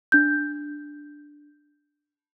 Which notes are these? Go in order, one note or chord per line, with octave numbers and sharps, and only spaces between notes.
D4 G6